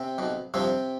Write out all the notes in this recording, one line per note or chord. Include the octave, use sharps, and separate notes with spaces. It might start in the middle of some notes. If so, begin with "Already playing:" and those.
Already playing: C3 C4
B1 B2
G2 C3 F3 C4